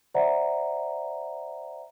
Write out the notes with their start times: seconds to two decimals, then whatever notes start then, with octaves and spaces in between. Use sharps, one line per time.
0.14 C5 D5 E5 F#5 A#5